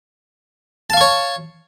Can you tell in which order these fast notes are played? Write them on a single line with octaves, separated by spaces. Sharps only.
A5 F5 C#6 C#5